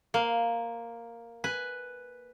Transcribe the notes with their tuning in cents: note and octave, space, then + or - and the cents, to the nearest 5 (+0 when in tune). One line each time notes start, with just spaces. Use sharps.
A#3 +0 C5 +0
B4 +0 G#5 +0